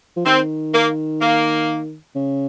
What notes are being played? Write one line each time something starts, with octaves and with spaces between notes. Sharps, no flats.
F3
D#3 C4
A#3
A#3
C#3